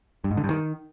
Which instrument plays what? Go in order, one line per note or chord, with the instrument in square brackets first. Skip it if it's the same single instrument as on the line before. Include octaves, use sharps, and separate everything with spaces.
[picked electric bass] G2
G#2
D3
G2
D#3